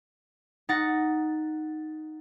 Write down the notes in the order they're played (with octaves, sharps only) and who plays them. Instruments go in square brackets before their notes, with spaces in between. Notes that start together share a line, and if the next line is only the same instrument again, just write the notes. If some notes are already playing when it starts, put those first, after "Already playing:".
[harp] D#4 F#5 A6 A#6 C#7